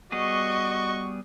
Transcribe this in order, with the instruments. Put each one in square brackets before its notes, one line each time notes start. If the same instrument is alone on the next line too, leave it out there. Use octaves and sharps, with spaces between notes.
[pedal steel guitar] G3 B3 G#4 [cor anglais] F#4 [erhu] D#5 [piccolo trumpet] C#6